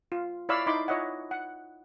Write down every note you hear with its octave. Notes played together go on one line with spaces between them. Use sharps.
F4
E4 C#5 D5 F5 B5 E6
D#4 E4 B5 C6 D6
F4 C#5 D#5 E5 F#5
F#5